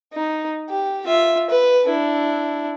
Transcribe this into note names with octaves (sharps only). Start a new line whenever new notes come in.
D#4
G4
F4 E5
B4
D4 E4